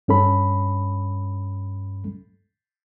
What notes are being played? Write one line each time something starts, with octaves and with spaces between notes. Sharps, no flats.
G2 C#4 A4 B5